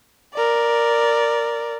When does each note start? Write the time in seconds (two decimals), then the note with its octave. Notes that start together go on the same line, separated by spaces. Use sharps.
0.34 A#4 D5